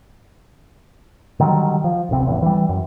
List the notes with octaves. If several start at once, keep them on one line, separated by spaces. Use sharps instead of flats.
D3 D#3 F#3 G3
F3
D#1 B1 C3
E1 A1 E2
E3 G3
F#2